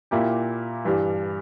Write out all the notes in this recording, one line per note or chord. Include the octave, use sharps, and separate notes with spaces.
A#2 A#3 E4 G4
G2 E3 G3